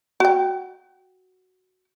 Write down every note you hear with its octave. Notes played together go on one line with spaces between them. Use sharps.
F#4 G5